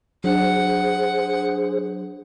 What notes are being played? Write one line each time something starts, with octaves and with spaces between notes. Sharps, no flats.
F#3 D4 G#4 C5 F#5